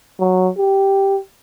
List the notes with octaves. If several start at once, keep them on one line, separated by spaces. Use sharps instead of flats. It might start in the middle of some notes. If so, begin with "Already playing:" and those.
F#3
G4